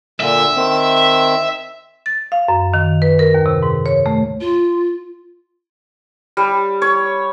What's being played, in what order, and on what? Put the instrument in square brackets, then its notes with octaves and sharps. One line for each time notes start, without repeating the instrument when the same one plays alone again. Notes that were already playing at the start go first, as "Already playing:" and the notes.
[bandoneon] A#2 D3 [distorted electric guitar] E5
[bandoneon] D#3 C4
[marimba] A6
F5
F#2
D#3
B4
A#4
D#2
C3
G#2
C#5
A3
[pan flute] F4
[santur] G3
C#5